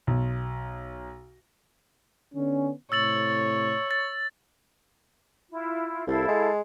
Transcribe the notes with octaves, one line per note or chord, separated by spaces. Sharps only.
B1
D3 B3 C#4
A2 C3 C#5 E6 A6 F#7
A6
E4 F4
C2 E4 A4 F5
G#3